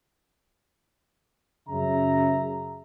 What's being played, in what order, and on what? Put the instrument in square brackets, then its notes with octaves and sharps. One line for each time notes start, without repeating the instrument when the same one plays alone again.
[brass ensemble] F#2 C#3 E5 A#5